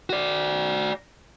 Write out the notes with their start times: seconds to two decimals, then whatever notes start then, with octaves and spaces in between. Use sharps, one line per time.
0.10 F#4 D5